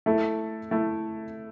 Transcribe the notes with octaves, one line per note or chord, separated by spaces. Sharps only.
A3 E4 A4
A3 E4 A4